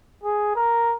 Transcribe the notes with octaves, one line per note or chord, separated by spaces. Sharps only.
G#4
A#4